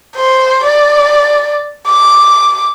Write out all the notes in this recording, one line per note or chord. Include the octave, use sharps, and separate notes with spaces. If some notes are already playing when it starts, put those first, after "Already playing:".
C5
D5
D6